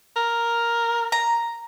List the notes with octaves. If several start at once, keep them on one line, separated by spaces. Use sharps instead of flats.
A#4
A#5